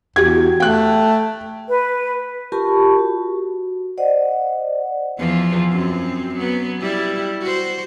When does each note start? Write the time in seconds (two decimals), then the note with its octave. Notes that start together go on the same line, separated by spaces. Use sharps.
0.16 E2 F#4 G4 G#6
0.60 A3 G5 F#6
1.68 B4
2.52 F4 G4 A#4 A5 B5 C#6
2.99 F#4
3.97 C5 D5 D#5 F#5
5.19 E2 F3 F4
5.72 F#2 C4
6.36 F#3 B3
6.81 G3 E4
7.41 F#4 C5